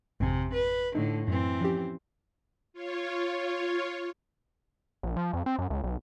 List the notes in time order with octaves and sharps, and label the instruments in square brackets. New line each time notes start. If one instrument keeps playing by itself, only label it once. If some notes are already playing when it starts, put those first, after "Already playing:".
[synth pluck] G#1 F2 G#5 [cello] C3
[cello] B4
[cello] A2 D3 [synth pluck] D#4
[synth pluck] F#2 [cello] E3 C4
[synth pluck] F3 C#4 G4
[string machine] F4 C#5
[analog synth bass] A#1
F3
F2
C4
F#2
C#2
B1